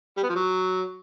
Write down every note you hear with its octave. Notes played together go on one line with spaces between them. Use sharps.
G3
B3
F3
F#3